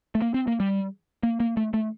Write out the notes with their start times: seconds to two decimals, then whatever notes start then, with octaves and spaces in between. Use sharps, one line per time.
0.15 A3
0.22 A#3
0.34 C4
0.47 A#3
0.60 G3
1.23 A#3
1.40 A#3
1.57 A3
1.74 A3